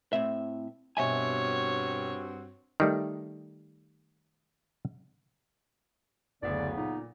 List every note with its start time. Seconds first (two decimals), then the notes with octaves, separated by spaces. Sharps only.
0.13 A2 C4 E5
0.97 G2 B2 C4 F#4 C#5 E5 G#5
2.80 D#3 G3 A3
6.42 F#1 D2 C#3 F#3 B3 D5
6.77 A#2 D#4